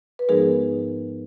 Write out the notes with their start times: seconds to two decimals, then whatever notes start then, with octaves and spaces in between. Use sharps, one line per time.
0.19 B4
0.29 G#2 F3 G#3 B3 D#4 G#4 A#4